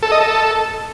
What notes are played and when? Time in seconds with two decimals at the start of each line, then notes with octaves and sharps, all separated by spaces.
0.03 A4
0.12 D#5
0.21 A4